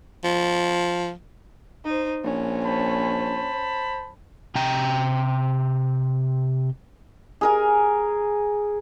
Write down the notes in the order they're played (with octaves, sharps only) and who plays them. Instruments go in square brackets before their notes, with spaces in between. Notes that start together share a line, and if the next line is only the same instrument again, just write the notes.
[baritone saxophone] F3
[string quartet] D#4 C5
[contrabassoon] A#1 [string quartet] C#4
[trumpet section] C5 A5 B5
[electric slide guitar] C3 G5 A#5
[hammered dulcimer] G#4 A#4 G#5